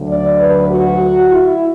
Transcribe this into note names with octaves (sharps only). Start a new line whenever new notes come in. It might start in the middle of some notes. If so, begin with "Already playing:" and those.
Already playing: D2 D3 F#3
D5
B4
F#4
E4